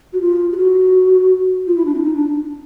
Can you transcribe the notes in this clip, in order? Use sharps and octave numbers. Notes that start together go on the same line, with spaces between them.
F#4
F4
G4
F#4
F4
E4
D4
C4
D#4
D4